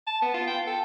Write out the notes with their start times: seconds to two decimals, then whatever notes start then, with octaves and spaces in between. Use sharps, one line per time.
0.07 A5
0.22 B3
0.34 F4
0.48 G5
0.67 A4